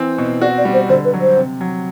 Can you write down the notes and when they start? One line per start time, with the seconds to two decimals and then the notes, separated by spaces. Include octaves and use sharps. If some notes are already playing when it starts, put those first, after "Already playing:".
Already playing: E3 C4
0.18 B2
0.41 F#4 D5
0.58 D5
0.65 G3
0.74 C5
0.89 D3 C5
1.05 B4
1.13 F#3
1.21 C5
1.37 C3
1.61 F#3